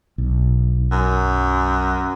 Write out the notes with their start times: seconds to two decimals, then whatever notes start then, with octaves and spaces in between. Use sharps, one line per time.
0.18 B1
0.92 F#2